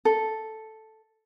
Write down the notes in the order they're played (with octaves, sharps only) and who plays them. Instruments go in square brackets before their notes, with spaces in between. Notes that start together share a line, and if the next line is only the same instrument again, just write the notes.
[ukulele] A4